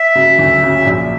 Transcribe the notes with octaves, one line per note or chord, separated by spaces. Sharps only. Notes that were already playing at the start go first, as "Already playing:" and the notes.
Already playing: E5
C#3 F#3
D2
C#3 F#3
A#1